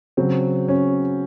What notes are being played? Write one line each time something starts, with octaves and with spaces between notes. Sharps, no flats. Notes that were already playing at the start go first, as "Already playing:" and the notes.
C#3 F#3 C4
C#4